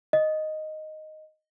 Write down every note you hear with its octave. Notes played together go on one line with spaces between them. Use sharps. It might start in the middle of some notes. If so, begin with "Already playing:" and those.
D#5